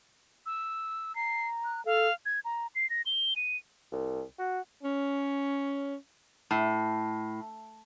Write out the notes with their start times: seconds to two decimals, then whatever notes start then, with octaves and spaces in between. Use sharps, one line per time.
0.46 E6
1.15 A#5 C7
1.64 F#6
1.85 A4 F5
2.26 G#6
2.45 A#5
2.75 C7
2.90 A#6
3.06 G7
3.36 D#7
3.92 C2
4.39 F#4
4.83 C#4
6.51 A2